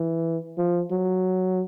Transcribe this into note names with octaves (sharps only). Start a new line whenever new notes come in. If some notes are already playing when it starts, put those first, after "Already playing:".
Already playing: E3
F3
F#3